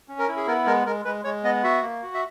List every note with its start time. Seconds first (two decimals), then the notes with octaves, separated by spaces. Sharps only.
0.08 C#4
0.19 A#4
0.28 E4
0.37 G#4
0.47 B3 A#4
0.66 G#3 A#4
0.86 G#3 A#4
1.05 G#3 B4
1.24 G#3 C#5
1.44 B3 D#5
1.64 F#4 E5
1.82 A#3
2.03 F#4
2.14 E5